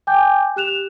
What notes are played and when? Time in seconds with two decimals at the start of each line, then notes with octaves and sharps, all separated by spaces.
0.07 G5 G#5 D6 G6
0.56 G4 F#6 E7 F7